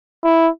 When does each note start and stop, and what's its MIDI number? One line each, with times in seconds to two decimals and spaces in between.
0.24 0.49 64